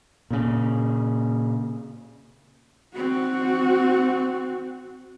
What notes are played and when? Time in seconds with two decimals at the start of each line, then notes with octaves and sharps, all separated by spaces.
0.30 A#2 C#3
2.95 C4 F#4